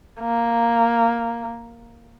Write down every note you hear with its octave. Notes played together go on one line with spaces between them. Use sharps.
A#3